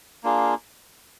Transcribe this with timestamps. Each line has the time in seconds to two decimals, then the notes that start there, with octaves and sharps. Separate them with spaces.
0.24 A#3 D4 F4 G#4